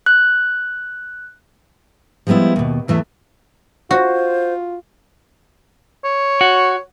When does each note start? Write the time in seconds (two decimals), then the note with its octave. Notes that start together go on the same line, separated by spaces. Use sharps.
0.06 F#6
2.27 F3 G3 G#3 B3 E4
2.56 D#2 B2
2.88 E2 E3 A3 E5
3.91 F4 F#4 C5
6.05 C#5
6.41 F#4